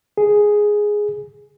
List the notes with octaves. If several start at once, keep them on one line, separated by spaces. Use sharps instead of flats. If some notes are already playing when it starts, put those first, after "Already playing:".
G#4